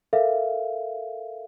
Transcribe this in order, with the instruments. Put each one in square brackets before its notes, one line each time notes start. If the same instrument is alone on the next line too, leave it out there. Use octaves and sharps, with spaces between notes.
[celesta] A4 A#4 E5 F5